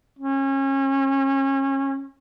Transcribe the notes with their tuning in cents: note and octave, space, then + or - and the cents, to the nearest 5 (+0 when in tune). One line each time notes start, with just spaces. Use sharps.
C#4 -30